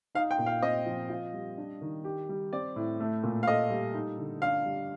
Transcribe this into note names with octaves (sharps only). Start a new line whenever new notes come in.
D#4 F5
G5
A#2
F5
C4 D#5
F3
F4
G3
D4
D#3
G4
G3
C4 D5
A2
A3
A#2
F5
A4 D#5
G3
D#4
D3
D4 F5
G3